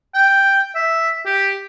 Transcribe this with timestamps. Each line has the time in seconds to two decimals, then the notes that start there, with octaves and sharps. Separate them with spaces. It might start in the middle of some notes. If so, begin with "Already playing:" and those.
0.14 G5
0.75 E5
1.25 G4